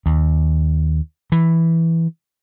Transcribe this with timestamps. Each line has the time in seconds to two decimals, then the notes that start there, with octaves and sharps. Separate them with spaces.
0.06 D#2
1.32 E3